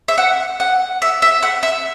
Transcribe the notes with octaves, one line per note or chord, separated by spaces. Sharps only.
E5
F#5
F#5
E5
E5
F#5
E5